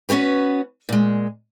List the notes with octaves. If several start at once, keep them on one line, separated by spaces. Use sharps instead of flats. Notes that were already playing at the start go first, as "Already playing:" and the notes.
B3 C#4 F#4 G4 B4
A#2 G#3